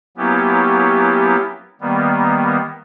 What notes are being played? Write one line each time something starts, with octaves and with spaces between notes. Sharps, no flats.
F#3 A#3 B3 C#4 E4 G4
D#3 G3 A#3 B3